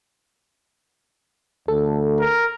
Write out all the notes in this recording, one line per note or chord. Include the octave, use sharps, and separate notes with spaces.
D2 A4
A#4